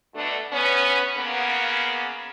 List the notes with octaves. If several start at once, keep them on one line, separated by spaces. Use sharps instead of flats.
B2 D3 A3 D4
B3 C#4
C#3 A#3 B3